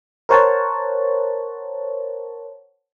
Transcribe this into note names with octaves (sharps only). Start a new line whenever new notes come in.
A#4 C5 C#5 F#5 A5